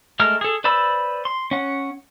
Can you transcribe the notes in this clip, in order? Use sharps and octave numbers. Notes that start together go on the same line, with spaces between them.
G#3 A3 A#4 F6
G#4 A4
B4 C5 D5 B5 E6
C6
C#4 F#5